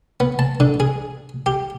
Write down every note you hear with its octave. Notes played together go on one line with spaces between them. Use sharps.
B3
A5
D3
G#4
G4